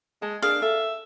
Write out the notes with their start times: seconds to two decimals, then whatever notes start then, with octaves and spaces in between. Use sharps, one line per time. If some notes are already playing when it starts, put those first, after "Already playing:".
0.22 G#3 A5
0.42 D4 G#4 A#4 F5
0.62 A4 E5